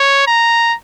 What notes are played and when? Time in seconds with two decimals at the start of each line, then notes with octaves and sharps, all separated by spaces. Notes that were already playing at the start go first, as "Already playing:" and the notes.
Already playing: C#5
0.27 A#5